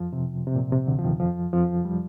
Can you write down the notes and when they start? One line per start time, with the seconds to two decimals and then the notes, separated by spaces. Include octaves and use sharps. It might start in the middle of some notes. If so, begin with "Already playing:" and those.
Already playing: F2 F3
0.13 C3
0.47 C3
0.55 A#2
0.72 C3
0.88 D2 D3
0.98 F3
1.04 D#2 D#3
1.20 F2 F3
1.53 F2 F3
1.85 G3